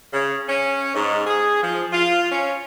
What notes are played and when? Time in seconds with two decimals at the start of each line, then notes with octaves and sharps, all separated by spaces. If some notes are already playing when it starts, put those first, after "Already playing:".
0.12 C#3
0.48 C#4
0.94 G#2
1.27 G#4
1.63 F3
1.93 F4
2.32 C#4